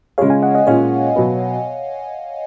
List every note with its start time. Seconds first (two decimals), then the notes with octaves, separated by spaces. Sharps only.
0.18 C#3 G#3 C#4 F4 G#4 C#5 F5
0.30 F5 G#5
0.42 D#5 F#5
0.54 D#5 F#5
0.67 A#2 G#3 C#4 C#5 F5
1.16 B2 F#3 B3